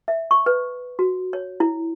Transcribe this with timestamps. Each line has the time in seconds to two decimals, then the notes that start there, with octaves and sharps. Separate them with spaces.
0.08 E5
0.31 C#6
0.46 B4
0.99 F#4
1.33 C#5
1.60 E4